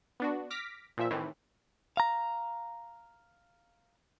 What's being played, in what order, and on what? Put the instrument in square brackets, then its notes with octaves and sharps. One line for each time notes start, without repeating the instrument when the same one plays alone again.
[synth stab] B3 D4 F#4
D6 F6 A#6 B6
A#2 F3 E5
A2 C3 D#3 E3
[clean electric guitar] F5 A#5